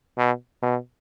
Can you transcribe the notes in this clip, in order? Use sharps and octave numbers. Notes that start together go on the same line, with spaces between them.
B2
B2